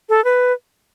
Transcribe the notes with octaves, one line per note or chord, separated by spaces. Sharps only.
A4
B4